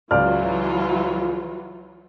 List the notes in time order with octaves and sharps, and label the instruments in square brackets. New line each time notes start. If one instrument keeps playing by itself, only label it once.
[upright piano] C#2 D5 F6 [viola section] E3 F#3 F4